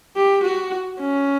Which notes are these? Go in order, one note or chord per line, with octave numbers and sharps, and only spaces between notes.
G4
F#4
C#4